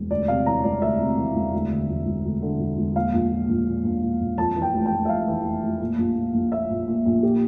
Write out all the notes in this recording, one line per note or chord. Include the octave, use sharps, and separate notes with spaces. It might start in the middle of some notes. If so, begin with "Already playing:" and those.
Already playing: E1
D2 D5
C3 F5
E3 A#5
E1 D5
D2 E5
C3
E3
E1
D2
D3
E1
E1
D2
D3
E1
E1
A#2 F5
A#1
A#2
A#1
A#2
A#1
A#2
A#1
F2 A5
E3
G5
F1
G5
F1
E5
F2 F5
E3
F1
F1
A#2
A#1
A#2
A#1
A#2 E5
A#1
A#2
A#1
A#2 G4